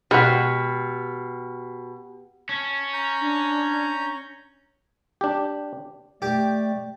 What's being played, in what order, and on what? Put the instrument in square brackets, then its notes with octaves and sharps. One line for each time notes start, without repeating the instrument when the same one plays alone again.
[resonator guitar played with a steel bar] B2 [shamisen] G#3 F#4 [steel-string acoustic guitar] G4 [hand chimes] F6 B6
[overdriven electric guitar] C#4 [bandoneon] A5
[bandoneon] A#5 G6
[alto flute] D4
[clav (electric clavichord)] D4 G4
[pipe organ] A3 D5 [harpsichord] G4